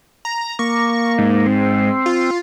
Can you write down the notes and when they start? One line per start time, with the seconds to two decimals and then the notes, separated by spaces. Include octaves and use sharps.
0.25 A#5
0.59 A#3 C#6
1.18 G#2
1.46 C4
2.06 F4